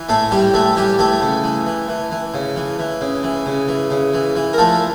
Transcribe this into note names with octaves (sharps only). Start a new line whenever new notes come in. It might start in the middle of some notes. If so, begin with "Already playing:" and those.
Already playing: E3
A2 A3 A4
A2 G3 G4
E3 A3 A4
E3 G3 G4
E3 A3 A4
C#3
E3
E3
E3
E3
C#3
E3
E3
C#3
E3
C#3
E3
C#3
E3
E3
A#4
F3 A3 A4